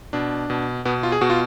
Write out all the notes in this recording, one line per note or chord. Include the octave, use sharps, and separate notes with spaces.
B2 D4
B2
B2 B3
F4
G#4
B2 F#4
F4